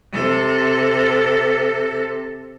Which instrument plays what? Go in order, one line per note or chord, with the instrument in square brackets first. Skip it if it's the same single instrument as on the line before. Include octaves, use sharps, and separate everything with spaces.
[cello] C3 A4